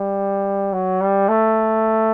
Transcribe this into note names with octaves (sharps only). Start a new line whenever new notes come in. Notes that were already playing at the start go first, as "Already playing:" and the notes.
Already playing: G3
F#3
G3
A3